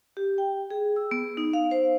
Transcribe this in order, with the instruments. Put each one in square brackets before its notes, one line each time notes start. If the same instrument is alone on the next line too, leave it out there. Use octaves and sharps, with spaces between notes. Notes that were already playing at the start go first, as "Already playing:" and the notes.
[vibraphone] G4
G5
G#4
E6
B3
D#4
F5
C5